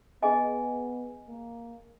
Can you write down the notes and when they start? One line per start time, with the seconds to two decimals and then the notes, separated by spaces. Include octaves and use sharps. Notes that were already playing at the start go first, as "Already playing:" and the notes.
0.22 B3 G#4 D#5 G#5
1.28 A#3